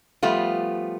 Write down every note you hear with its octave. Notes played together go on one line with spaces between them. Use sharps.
F3 G3 A3 B3 F4